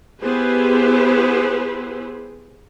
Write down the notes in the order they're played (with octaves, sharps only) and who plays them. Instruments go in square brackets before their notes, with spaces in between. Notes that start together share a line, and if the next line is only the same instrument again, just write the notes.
[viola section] B3 E4 G4 G#4 B4 C5